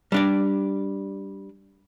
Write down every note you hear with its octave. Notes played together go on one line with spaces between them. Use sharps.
G3 D4 D5